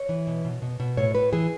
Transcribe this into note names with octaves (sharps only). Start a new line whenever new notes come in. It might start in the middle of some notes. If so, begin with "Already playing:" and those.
Already playing: C#5
E3
B2
B2
B2
B2
A2 C#5
A2 B4
E3 G#4